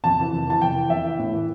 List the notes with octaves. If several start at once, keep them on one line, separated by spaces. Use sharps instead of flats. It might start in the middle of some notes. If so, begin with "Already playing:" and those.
F2 A5
C3 E3
F2
C3 E3 A5
F2 G5
E3
F2 E5
E3
A2
E3